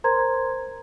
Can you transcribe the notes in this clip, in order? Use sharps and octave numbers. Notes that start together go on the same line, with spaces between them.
A#4 C5 A#5 C6 G#6